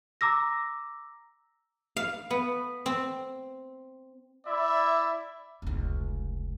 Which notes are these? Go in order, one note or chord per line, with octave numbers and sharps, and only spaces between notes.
A#5 D6 E6 A#6
F5
B3
C4
E4 D5 E5
F1 C#2